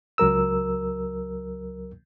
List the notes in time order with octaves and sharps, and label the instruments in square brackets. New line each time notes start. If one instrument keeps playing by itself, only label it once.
[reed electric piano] C#2 F#3 A#4 E6